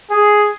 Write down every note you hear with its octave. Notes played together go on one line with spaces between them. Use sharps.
G#4